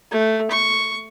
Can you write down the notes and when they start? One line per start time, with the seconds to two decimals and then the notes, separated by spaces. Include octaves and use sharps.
0.11 A3
0.51 C#6